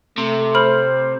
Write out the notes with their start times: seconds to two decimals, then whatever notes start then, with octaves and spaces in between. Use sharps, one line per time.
0.18 C3 A3
0.55 C5 B5 F6 F#7